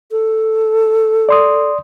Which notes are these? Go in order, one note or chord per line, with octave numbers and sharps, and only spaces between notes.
A4
D5 C6 D#6